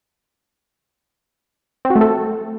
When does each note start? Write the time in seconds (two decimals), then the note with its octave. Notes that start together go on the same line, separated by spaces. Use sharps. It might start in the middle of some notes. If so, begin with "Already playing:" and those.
1.85 C4
1.90 F#4
1.96 A3
2.01 A4